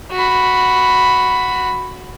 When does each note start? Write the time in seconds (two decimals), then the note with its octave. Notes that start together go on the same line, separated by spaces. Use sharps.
0.12 F#4 B5